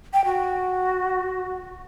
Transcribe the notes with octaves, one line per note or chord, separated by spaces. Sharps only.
G5
F#4